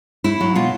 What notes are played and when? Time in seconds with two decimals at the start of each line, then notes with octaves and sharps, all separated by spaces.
0.24 A3 E4
0.40 F#3
0.55 B2 F4